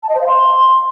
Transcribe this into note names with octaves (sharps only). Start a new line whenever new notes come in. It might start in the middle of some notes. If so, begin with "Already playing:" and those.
A5
D#5
C5
F5
C6